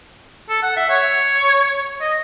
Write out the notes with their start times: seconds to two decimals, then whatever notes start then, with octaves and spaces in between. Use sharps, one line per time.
0.49 A4
0.63 F#5
0.77 E5
0.90 C#5
2.01 D#5